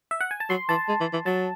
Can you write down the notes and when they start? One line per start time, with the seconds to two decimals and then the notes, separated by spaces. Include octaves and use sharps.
0.11 E5
0.21 F#5
0.31 G#5
0.40 A5
0.50 F#3 C6
0.69 E3 A5
0.88 G#3
1.00 E3
1.13 E3
1.26 F#3 A5